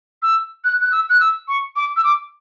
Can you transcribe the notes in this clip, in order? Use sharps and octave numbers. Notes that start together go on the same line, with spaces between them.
E6
F#6
F#6
E6
F#6
E6
C#6
D6
E6
D6